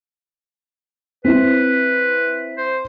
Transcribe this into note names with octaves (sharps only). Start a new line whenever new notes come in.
C4 E4 B4
C5